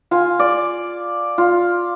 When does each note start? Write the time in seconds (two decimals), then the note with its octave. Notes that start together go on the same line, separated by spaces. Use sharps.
0.11 F4 G#5
0.39 D5
1.38 F4